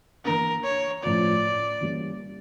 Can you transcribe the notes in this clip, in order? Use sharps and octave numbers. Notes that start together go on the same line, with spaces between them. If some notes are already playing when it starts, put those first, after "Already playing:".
E3 A#3 D4 A#4
C#5
A2 F3 A3 C#4 F4 D5
E3 G3 A#3 C#4